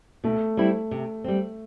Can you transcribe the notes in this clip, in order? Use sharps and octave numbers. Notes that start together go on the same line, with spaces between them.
B2 A3
G3 C4 E4
C3
G3 C4